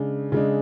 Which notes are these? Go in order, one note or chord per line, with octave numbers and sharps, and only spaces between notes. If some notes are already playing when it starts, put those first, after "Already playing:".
Already playing: C#3 G#3 D4
C#3 G#3 D4